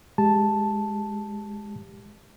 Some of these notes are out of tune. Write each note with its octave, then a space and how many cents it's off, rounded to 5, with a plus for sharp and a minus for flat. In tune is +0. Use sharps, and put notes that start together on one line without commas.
G#3 +0 G4 +0 A5 +0